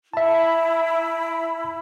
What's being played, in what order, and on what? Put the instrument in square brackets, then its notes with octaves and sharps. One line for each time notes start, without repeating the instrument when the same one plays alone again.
[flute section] E4 B5 [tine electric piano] E5 A5